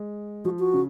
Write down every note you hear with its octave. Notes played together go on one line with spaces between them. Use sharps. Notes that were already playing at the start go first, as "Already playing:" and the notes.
Already playing: G#3
F3 F#4
F#4
C#3